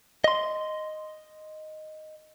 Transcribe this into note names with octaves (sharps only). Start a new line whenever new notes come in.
D#5 C6